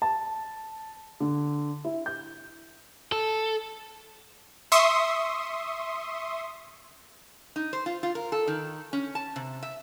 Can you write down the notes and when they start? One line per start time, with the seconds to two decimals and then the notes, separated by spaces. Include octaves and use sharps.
0.02 A5
1.20 D3
1.85 E4
2.06 G6
3.12 A4
4.72 E5 C6 C#6 D#6
7.56 D#4
7.73 C5
7.86 F4
8.03 F4
8.15 A#4
8.32 A4
8.47 D#3
8.93 C#4
9.15 A5
9.36 C3
9.63 E5